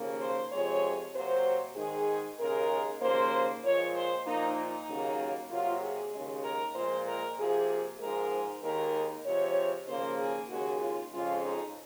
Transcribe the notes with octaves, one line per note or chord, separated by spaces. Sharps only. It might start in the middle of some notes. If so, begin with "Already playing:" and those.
Already playing: D#2 C#3 F3 A#3
C5
F2 C3 F3 G#3 C#5
C3 F#3 A#3 C5
G#2 D#3 G#3 G#4
D#2 C#3 G#3 A#4
D#2 C#3 F3 A#3 C5
A#2 F3 G#3 C#5
C5
A#2 F3 A#3 D#4
D#4
D#2 C#3 F#3 A#3
C3 F#3 A#3 F4
G#4
D#2 C#3 G#3
A#4
A#2 F3 G#3 C5
A#4
C3 F3 A#3 G#4
G#2 F3 G#3 A#4
D#2 D#3 G#3 A#4
C3 F3 G#3 C#5
D#2 C#3 F3 A#3 C5
G#4
D#2 C#3 G#3 F#4
F4
F2 C#3 F3 G#3 F4
D#4